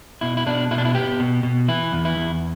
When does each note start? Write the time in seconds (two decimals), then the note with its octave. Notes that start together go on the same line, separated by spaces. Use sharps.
0.21 B2 E4
0.37 E4
0.46 B2 D4
0.71 B2 E4
0.78 D4
0.85 E4
0.95 B3 G4
1.19 B2
1.43 B2
1.68 E3 E4
1.92 E2
2.05 E4
2.17 E2